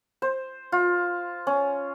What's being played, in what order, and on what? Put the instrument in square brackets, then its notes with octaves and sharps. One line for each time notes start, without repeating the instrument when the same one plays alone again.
[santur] C5
F4
C#4